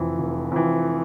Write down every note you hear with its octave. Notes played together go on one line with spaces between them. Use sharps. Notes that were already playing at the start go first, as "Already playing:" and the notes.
Already playing: F1 F2 E3
F1
F2 E3